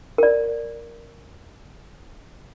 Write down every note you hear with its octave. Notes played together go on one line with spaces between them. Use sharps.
A#4 D5